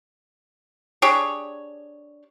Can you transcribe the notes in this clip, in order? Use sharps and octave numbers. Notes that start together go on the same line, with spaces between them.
D4 G4 G#4 C#5